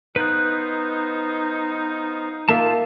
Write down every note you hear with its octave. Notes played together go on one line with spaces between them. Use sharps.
B3 D#4 B4 C5 F5 F#6
A#3 F4 E5 F#5 A5